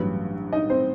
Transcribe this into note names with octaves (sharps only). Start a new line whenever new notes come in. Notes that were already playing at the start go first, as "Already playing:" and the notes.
Already playing: A1 G2 F#3 B4
D#4 D#5
C4 C5